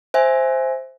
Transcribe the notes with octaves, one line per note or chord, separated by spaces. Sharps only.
C5 E5 G#5